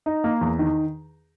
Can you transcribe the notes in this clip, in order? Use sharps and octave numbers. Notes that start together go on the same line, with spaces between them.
D#4
A#3
E2
D#3